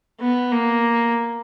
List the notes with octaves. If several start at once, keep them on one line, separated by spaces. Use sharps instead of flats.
B3
A#3